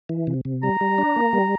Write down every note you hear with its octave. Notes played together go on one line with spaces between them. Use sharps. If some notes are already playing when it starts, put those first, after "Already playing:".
E3
C3
C3
G3 A#5
G3
D4
A#3
G3